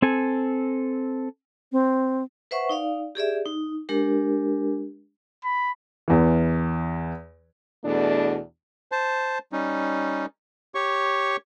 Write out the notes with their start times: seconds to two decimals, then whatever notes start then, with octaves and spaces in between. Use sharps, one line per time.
0.02 C4 A4 G#5
1.72 C4
2.51 B4 C5 E5 F#5 C#6
2.69 D#4 D5 F5
3.15 G4 G#4 D5 E5
3.46 D#4
3.89 G#3 D4 G4 A#4
5.44 B5
6.08 E2 E3
7.83 E2 B2 A3 D4
8.92 C5 A5
9.52 G3 C#4 D#4
10.75 G4 C#5 C#6